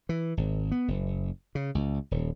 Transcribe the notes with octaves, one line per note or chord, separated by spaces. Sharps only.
E3
G#1
B3
F#1
C#3
C#2
D#1